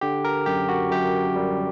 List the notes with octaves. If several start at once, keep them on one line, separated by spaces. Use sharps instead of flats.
D3 G4
A#4
F#2 G4
F#4
F#2 G4
G3